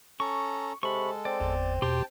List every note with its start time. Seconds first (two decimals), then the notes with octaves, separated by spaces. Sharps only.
0.20 C#4 A4 A#5 C#6
0.83 C3 G#3 A4 B5 C#6
1.25 C4 D5
1.40 G1 E2
1.82 E2 B2 G4 G5 A5 C6